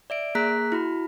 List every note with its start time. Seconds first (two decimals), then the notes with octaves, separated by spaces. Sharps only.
0.10 D5 E5 D7
0.35 A#3 G#4 A#5 F#6 B6
0.72 E4 F#4 B5